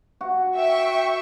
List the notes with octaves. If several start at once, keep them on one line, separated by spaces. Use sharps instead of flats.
F#4
E5 G5 C#6